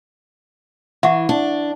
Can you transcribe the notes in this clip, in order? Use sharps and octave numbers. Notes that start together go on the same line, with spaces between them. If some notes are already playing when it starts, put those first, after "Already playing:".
E3 E5 F#5 C#6
D4